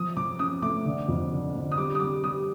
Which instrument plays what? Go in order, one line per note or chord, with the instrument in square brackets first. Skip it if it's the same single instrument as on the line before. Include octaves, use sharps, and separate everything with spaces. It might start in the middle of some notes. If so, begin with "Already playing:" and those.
Already playing: [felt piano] F3 [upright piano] D#6
[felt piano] F3 [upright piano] D6
[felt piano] C#4 [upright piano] D#6
[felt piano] A3 [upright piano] D6
[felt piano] D3
F2
D3
D3
[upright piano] D#6
[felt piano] G3 [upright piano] D6
[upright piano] D#6
[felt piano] G3 [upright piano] D6
[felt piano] G3 [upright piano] D#6